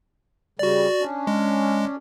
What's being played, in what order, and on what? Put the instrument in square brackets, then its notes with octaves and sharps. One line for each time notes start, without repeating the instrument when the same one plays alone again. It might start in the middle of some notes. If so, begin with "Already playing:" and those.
[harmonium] C#3 G3 [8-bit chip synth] F#4 D5
[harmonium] C#4 D4
[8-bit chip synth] G#3